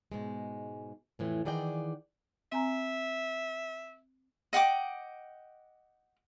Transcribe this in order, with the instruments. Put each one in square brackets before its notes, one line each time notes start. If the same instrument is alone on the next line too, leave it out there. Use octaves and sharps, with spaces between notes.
[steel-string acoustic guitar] G#2 B2 G#3
F2 A2 E3
D#3 E3 G#4 D5 F#5 G5
[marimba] C4 G#5 A#5 [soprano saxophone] E5
[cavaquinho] D#5 F#5 G5 D6